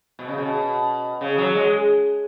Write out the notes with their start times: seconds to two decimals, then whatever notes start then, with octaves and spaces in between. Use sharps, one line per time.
0.19 B2
0.28 C#3
0.38 B2
1.21 C#3
1.38 F#3
1.55 G#3